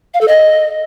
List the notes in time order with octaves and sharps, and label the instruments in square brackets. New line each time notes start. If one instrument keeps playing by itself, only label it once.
[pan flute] F5
A4
D#5